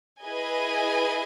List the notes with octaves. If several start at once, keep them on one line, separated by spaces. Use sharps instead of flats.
E4 G#4 B4 D#5 G#5